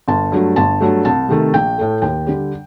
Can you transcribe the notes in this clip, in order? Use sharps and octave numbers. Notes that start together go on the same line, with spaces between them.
G1 A5
G2 F#3 A3
G1 A5
G2 F#3 A3
C2 A5
C3 D#3 A3
A#1 G5
A2 A3
D#2 G5
D3 G3